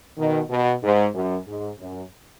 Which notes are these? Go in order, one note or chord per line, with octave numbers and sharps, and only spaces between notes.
B2 D#3
B2
G#2
F#2
G#2
F#2